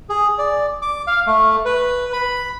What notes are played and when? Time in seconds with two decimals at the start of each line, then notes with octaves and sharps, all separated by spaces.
0.09 G#4
0.38 D5
0.82 D6
1.07 F5
1.26 A3
1.65 B4
2.13 B5